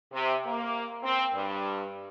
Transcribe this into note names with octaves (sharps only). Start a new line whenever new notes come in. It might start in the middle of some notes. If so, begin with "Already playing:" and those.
C3
A#3
C4
G2